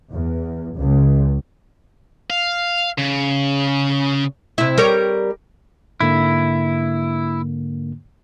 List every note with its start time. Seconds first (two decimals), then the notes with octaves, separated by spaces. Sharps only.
0.11 E2
0.77 C#2
2.30 F5
2.98 C#3
4.58 C3 E4
4.78 G3 A#4 C#5
6.00 G#2 D3 A#3 E4